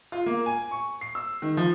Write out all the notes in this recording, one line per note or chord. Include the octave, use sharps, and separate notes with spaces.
F4
A#3
G#5
C#6
C7
E6
D#3
F3